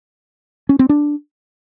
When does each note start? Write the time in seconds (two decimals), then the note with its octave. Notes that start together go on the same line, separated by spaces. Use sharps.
0.69 C#4
0.79 C4
0.89 D4